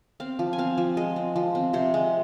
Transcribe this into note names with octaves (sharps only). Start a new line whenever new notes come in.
C4 F5
F3
G#5
C4 F5
F3
G#3 D#5
C4
F3
C4
C3 C5
G#3